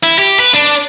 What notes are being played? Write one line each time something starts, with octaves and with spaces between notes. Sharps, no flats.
E4
G4
B4
D4